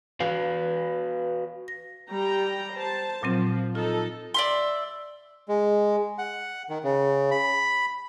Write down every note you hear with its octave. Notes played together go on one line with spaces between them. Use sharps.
F#4 B4 F5
A#6
G3 G5 A#5
C5 A5
A#2 F3 F#3 C4 F4
D#4 F4 A4
D5 E5 C6
G#3
F#5
D#3
C#3
B5